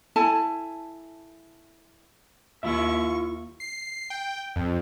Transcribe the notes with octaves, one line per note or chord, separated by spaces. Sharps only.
E4 A4 G#5 A5
D#2 E4 F4 E5 C#6
C7
G5
F2